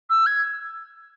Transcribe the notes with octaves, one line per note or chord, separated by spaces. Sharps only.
E6
G#6